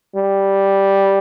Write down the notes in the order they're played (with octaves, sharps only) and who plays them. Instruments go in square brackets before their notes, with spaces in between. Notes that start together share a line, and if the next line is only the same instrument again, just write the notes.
[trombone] G3